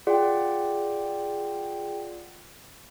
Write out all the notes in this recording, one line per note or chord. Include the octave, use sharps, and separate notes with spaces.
F4 G#4 D5 F#5 G5